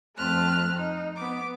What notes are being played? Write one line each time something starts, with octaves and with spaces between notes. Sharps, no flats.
F2 A3 C4 A5 F6 F#6
D#4
B3 D6